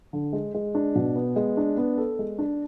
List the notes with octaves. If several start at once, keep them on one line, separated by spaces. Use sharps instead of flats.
D3
G#3
G#3
D4
B2
B3
G#3
D4
B3
A4
G#3
D4